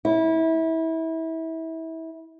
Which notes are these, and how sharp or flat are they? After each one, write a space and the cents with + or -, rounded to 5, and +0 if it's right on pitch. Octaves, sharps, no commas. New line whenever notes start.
E4 -25